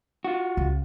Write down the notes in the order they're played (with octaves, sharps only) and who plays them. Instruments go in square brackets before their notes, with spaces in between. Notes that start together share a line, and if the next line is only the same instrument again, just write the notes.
[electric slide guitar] F4 F#4
[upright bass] C#2